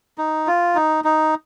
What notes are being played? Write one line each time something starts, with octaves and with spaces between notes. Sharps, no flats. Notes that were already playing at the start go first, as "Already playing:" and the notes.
D#4
F4
D#4
D#4